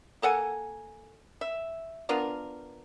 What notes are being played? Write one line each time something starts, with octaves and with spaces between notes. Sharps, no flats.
A#3 A4 F#5 G#5
E5
B3 D4 F4 A#4